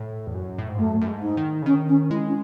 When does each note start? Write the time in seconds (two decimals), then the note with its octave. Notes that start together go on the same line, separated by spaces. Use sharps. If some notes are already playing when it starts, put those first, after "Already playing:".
Already playing: A2
0.27 E2
0.34 F#2
0.58 A2
0.69 G#2
0.78 F#2 A3
1.01 F#2
1.08 G#2
1.22 D#4
1.37 D#3
1.62 C#3
1.66 D#3 C#4
1.88 C#4
2.10 G#3 E4
2.27 C#4